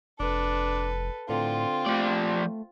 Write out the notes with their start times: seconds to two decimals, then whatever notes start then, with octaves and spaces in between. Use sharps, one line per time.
0.20 F1 D4 A4 B4
1.29 A2 D3 C4 F4
1.86 F3 A3 G4 D5